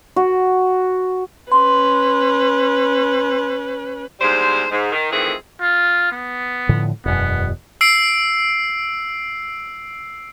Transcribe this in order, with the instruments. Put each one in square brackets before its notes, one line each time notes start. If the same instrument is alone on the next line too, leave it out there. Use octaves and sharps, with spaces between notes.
[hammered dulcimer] F#4
[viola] C#4 B4 [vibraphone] C6
[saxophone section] E2 G#2 G3 E4 C5
G#2
D#3
F2 D#3 E3 A3 C4 G#4
[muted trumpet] F4
B3
[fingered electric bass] A2 D3 F3
[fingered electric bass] E1 F#2 [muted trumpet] B3
[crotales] E6 C7 D7